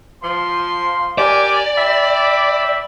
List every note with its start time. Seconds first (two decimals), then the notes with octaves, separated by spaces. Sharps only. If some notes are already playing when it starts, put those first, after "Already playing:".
0.23 F3 C6
1.18 G4 A#4 D5 G#5
1.78 E5 G5 B5